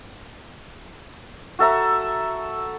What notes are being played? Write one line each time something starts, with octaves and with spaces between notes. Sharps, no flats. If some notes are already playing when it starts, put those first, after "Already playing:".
F#4 A4 E5 A#5